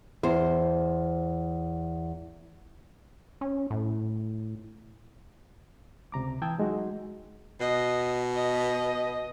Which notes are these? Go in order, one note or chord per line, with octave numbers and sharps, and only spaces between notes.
E2 C5
C#4
A2
C#2 C3 A#5 D6
E3 G5 A5 D#6 E6 G#6
F#3 G#3 D#4 F#4
B2 D#5
D#5